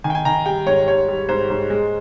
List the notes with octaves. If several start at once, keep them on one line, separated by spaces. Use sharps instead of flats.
D#3 G#5
G5
G#5
D#3 A#5
G3 G5
G#2 C#5
G3 C#5
G3
G#2 C5
G#2
G#3